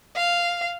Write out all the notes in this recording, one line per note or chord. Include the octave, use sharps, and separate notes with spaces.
F5